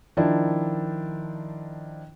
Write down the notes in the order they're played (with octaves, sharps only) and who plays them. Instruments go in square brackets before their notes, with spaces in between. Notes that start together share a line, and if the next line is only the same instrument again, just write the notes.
[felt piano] D#3 F3 D4 E4